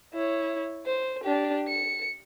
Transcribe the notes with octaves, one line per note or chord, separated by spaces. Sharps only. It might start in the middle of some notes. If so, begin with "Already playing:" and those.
E4 C#5
C5
D4 G4
C#7